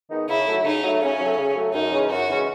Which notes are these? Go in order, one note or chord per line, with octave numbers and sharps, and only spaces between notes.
D#3 G#3 B3 D#4
C#3 E4
F#3 A3
C#3 D#4
F#3 A3
C#3 C#4
F#3 A3
C#3
F#3 A3
F#2 D#4
C#3 E3 G#3 C#4
F#2 F#4
C#3 E3 G#3 C#4